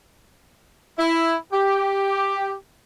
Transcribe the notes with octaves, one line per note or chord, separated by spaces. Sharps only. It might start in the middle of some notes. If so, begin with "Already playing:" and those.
E4
G4